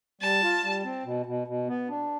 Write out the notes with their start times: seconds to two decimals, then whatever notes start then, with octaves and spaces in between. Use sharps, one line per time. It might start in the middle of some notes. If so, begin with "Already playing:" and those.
0.21 G3 A5
0.43 F4
0.63 G3
0.84 C4
1.05 B2
1.26 B2
1.47 B2
1.68 B3
1.89 D4